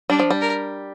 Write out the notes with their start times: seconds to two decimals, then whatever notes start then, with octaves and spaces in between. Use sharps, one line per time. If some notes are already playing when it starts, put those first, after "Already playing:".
0.10 G3 D4
0.20 F3
0.30 G3
0.41 A#4